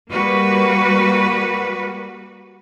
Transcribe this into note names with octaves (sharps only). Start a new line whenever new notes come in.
G3 A#3 F#4 B4